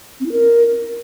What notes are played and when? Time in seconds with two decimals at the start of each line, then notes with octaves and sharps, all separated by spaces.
0.20 C4
0.26 E4
0.32 A#4